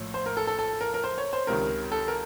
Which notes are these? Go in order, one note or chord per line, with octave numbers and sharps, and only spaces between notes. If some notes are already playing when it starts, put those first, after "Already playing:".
Already playing: A#1 A2
C5
A#4
A4
A4
A4
A#4
A#4
C5
C#5
C5
C#2 C3 D#3 A#4
A4
A#4